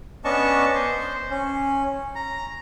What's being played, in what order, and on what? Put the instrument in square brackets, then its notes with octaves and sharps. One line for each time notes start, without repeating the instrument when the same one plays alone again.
[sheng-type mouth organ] B3 C#4 D4 D#5 A5 C#6
C5
C#4
A#5